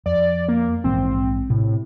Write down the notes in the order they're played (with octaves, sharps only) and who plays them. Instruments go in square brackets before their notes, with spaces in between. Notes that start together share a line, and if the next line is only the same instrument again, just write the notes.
[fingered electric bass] F2 [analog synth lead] D5
[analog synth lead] A#3
[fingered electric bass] A#1 G#2 E3 [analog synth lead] C4
[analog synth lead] A2 [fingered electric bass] C3